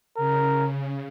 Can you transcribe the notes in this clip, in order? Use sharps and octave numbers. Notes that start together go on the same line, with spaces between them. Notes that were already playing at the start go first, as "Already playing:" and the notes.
C#3 A#4